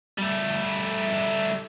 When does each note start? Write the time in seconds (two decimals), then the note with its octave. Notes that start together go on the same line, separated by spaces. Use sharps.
0.18 G3 A3